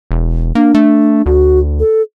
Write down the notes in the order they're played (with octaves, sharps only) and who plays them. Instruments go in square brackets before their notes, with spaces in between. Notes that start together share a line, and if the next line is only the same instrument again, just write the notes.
[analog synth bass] E1
[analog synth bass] A#3 [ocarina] D4
[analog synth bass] A3
[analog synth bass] D2 [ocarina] F#4
[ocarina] A4